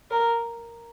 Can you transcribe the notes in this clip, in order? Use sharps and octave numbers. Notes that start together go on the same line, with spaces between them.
A#4